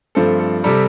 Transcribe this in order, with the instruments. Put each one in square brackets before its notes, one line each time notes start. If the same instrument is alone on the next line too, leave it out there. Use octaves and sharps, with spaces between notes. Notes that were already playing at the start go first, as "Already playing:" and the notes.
[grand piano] G2 F3 A3 C4 A4
A4
C3 G3 A4